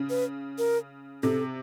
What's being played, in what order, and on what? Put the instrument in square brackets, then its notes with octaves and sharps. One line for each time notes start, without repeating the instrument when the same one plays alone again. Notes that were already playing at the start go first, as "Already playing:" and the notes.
Already playing: [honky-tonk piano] C#3
[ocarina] B4
A#4
[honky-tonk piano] C3 [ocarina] A4